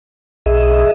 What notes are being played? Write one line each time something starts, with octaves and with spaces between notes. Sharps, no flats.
B1 G#4 D#5 E5